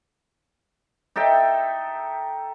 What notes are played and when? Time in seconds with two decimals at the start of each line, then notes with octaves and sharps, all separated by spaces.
1.16 D#4 A4 E5 G5